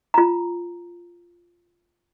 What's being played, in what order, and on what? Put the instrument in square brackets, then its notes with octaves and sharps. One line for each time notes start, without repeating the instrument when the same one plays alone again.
[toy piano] F4 A#5